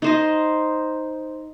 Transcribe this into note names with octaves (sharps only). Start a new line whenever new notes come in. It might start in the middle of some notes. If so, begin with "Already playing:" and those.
D#4 C5 D#5